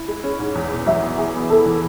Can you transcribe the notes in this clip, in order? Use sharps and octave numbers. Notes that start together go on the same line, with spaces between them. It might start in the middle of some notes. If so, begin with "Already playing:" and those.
Already playing: E4
G#3
C#4
G#2
E2
B2
F#3 E5
E2
G#4
B3
E4 A4
E3